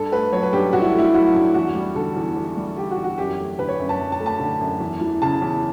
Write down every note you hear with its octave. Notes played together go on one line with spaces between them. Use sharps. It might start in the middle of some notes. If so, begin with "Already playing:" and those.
Already playing: G2 A4
A3 B4
F#3 C#5
B4
G2 G4
G2 F#4
E4
A3
E4
F#3 F#4
G2
E2 F#4
G3
D3 A4
E2
E2
G3
D3 G4
F#4
E2
F#4
F#2 G4
A3
D3 B4
C#5
F#2
A5
F#2
A5
A3
A5
D3
F#2
E2
E3
C#3 A5
E2